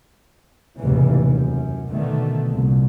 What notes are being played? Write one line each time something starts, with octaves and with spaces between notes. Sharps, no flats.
F1 D#2 A2 C#3 E3
F#2
B2 D3 D#3 A3
C2 A#2